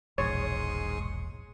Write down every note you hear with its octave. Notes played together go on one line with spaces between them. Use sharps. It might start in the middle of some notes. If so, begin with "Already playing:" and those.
E1 A#1 G#2 C#5 C6 C#6 D#6